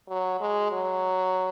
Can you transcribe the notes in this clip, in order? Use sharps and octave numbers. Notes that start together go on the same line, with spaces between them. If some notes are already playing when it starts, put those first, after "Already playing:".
F#3
G#3
F#3